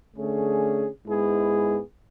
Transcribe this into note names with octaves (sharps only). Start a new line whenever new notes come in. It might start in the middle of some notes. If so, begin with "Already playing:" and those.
D3 A3 C#4 G#4
G#2 G#3 B3 E4 G#4